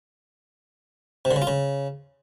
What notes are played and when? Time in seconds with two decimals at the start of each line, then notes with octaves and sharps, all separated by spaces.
1.25 C3
1.31 D3
1.36 C#3
1.42 F4
1.47 C#3